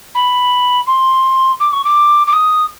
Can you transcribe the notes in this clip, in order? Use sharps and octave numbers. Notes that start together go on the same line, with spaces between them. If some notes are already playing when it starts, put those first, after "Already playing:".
B5
C6
D6
C#6
D6
D6
D#6